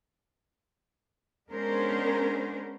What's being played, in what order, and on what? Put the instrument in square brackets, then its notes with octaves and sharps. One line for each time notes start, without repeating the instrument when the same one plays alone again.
[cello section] G#3 B3 C#4 D4 A#4 C5